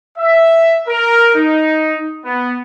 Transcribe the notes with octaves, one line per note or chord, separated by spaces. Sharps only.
E5
A#4
D#4
B3